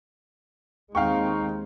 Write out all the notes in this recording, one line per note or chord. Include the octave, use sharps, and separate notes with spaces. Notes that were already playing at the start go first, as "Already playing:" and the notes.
D#2 G#3 C4 D#4 F5 G5 C#6